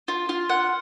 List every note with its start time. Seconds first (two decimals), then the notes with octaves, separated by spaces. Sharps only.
0.08 F4
0.29 F4
0.49 F#5